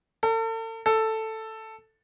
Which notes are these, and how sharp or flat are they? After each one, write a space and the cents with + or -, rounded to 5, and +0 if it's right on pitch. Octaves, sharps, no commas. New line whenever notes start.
A4 +40
A4 +5